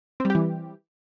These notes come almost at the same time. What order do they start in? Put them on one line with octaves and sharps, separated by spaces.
C4 G3 G4 E3